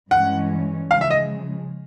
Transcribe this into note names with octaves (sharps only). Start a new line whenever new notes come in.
G2 E3 G#3 C#4 F#5
C#3 F3 G#3 F5
E5
D#5